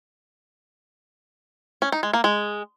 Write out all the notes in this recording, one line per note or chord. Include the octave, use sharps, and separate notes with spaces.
C#4
D#4
G#3
A#3
G#3